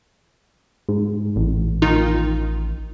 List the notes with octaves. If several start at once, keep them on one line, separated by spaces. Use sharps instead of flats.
G#2
A1
D#3 D#4 F4